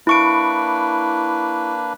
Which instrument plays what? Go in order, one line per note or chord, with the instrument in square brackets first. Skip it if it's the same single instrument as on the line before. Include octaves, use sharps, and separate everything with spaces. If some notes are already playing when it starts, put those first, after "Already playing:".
[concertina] A#3 D4 B4 [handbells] E4 C#6 D7